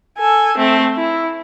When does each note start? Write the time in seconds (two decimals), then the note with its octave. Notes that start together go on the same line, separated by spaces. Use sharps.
0.18 A4 G#5
0.57 A3 C4
0.97 E4